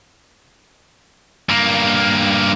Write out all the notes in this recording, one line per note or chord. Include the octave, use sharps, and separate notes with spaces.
G2 A#3